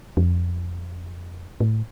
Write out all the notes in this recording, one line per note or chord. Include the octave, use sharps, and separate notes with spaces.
F2
A2